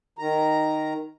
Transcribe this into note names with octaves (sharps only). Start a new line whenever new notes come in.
D#3 A#5